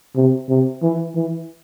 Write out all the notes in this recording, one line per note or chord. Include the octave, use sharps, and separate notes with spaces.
C3
C3
E3
E3